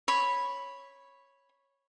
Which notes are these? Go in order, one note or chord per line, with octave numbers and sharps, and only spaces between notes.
C#5 B5